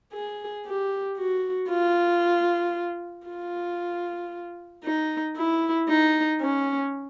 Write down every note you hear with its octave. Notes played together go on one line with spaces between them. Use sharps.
G#4
G4
F#4
F4
F4
D#4
E4
D#4
C#4